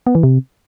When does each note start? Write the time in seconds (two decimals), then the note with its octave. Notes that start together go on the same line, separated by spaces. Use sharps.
0.07 B3
0.15 E3
0.23 C3